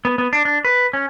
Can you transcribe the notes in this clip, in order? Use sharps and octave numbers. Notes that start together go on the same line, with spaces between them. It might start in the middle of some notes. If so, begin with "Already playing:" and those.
B3
B3
D4
D4
B4
C#4